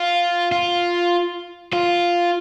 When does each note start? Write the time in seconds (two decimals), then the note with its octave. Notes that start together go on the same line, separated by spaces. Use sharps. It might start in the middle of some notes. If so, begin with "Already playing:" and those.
Already playing: F4
0.52 F4
1.73 F4